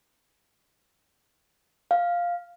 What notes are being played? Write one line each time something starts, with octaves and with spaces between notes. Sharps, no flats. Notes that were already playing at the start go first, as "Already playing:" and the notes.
F5